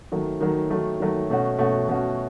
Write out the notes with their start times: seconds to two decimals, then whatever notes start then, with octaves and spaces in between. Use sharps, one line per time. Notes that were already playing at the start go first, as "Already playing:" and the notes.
0.12 D#3 F#3 A3
0.41 D#3 F#3 A3
0.70 D#3 F#3 A3
1.00 D#3 F#3 A3
1.29 B2 A3 C#4 F#4
1.58 B2 A3 C#4 F#4
1.88 B2 A3 C#4 F#4